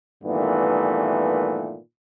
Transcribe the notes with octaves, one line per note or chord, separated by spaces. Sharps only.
G2 A#2 D#3 E3 A3 B3